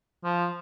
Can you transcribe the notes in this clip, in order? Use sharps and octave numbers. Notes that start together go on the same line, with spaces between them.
F3